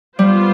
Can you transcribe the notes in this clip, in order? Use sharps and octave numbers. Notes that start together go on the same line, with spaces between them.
G3 B3 F4 C5